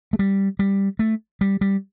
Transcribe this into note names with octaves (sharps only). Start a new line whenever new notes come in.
A3
G3
G3
A3
G3
G3